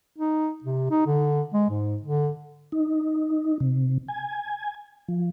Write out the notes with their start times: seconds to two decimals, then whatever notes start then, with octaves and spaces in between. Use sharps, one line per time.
0.18 D#4
0.64 C3
0.91 D#4
1.06 D3
1.53 G#3
1.70 G#2
2.02 D3
2.72 D#4
3.60 C3
4.08 G#5
5.08 F3